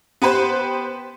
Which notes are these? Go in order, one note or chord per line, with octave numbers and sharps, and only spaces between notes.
B3 G4 B4 C5